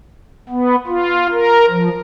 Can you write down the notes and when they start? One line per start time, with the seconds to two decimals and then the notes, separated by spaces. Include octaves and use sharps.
0.49 B3
0.87 F4
1.31 A#4
1.69 F3